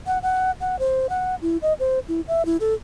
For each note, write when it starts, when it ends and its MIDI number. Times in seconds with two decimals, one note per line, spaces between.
0.07 0.18 78
0.23 0.51 78
0.61 0.76 78
0.79 1.07 72
1.10 1.35 78
1.42 1.57 64
1.62 1.73 75
1.80 1.99 72
2.08 2.21 64
2.28 2.45 76
2.46 2.57 64
2.60 2.74 69